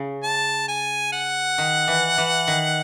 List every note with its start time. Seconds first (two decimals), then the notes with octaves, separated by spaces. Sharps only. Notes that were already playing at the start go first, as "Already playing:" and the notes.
Already playing: C#3
0.23 A5
0.68 G#5
1.13 F#5
1.58 D#3
1.88 E3
2.18 E3
2.47 D#3